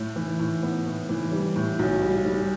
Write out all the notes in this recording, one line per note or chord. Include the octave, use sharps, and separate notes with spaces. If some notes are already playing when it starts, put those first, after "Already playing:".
Already playing: A2
E3
A2
B3
A2
E3
G3
A2
B1
G3
G3